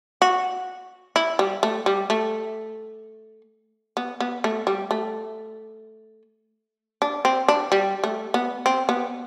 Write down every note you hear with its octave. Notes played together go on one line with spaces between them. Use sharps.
F#4
E4
G3
A3
G3
A3
B3
B3
A3
G3
A3
D4
C4
D4
G3
A3
B3
C4
B3